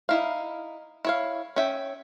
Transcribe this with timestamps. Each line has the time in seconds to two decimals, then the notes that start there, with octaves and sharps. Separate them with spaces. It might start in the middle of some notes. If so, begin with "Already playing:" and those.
0.09 D#4 E4 F5
1.05 E4 C#5 F5
1.56 C#4 E5 G5